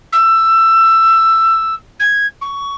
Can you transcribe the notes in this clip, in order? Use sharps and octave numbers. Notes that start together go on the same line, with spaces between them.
E6
G#6
C#6